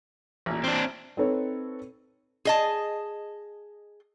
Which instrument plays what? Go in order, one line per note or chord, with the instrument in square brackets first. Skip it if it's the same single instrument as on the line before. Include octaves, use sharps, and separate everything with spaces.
[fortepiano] A1 A#2
[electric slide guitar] C4 D4
[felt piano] C4 D#4 A4 B4 C#5
[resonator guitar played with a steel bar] G#4 D#5 A5